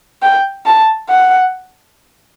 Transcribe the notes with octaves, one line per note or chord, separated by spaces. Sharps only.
G5
A5
F#5